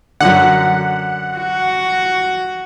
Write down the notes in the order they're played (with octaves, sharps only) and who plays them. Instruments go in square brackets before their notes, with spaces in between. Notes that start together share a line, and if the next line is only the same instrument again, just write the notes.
[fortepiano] F#2 D3 [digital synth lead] F#5
[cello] F#4